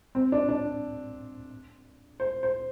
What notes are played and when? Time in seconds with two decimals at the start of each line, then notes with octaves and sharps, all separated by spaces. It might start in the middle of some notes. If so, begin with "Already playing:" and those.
0.15 C4
0.32 D4
0.49 D4
2.20 C5
2.43 C5